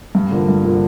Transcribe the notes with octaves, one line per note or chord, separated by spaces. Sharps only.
G2
D3 F3 A#3
G2
D3 F3 A#3